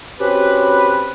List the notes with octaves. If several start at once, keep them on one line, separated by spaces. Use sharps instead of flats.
C4 C#4 F#4 G4 B4